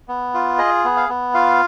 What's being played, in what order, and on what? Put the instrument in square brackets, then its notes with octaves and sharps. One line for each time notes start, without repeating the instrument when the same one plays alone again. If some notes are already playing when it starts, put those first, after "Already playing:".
[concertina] B3
F4
G#4 D#5
B3
F5
B3
F4 F5